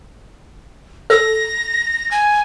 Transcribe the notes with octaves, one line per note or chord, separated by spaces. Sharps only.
A4 A#6
G#5